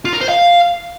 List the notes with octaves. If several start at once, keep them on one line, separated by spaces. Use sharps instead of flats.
F4
A#4
C5
F5